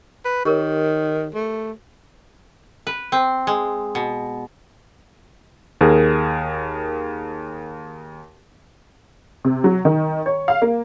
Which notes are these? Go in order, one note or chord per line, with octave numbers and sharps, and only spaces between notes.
B4
D#3 G4 A#4 C#5
A3
B4
C4
G#3
B2
D#2 G#4 A#4
C3
F#3
D#3
C#5
F5
A#3